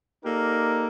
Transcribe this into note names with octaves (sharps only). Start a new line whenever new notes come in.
A#3 D#4 G4 A4 A#4 D5